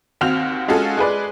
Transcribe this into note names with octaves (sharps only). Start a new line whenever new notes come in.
D#2 C4 F#4 F6 F7
G#3 C#4 F4 F#4 G#4 A4
G#3 G#4 B4 D5